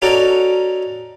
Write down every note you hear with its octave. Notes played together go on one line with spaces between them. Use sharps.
C#4 D#4 F#4 A4 D5